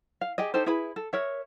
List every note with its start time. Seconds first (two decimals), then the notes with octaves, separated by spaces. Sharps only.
0.21 F5
0.38 G4 G#4 D#5
0.54 D#4 G4 A4 C5
0.66 E4 G#4 B4 B5
0.96 A4
1.13 A#4 C#5 E5